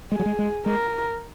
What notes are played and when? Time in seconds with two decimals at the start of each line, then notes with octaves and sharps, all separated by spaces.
0.12 G#3 G#4
0.19 F#3
0.26 G#3
0.39 G#3
0.66 G#3 A#4